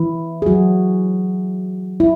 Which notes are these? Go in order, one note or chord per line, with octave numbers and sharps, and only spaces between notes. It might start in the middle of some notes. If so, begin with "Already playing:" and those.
Already playing: E3 E4
G#4
F#3 F#4
E4